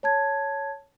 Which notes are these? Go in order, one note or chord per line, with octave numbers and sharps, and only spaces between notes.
C#5 A5 G#6